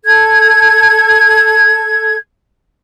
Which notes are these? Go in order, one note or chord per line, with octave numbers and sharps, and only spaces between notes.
A4 G#6